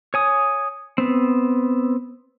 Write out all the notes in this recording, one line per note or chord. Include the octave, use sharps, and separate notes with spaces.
C#5 G#5 D#6
B3 C4